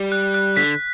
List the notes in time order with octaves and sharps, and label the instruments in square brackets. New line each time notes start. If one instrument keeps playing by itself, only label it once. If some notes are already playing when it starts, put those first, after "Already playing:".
Already playing: [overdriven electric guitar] G3
[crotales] F#6
F#6
[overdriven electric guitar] D3 [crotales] B6